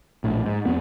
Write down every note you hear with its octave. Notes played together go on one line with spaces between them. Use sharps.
A#1 A2
G#2
F2 B3